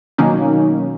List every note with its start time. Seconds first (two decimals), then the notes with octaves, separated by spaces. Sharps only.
0.18 B2 D#3 F#3 A#3 C#4 D#4